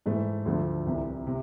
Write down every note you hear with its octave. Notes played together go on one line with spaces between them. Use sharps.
G#2 E3 A3
D2 D3 F3 A3
C2 C3 E3
C3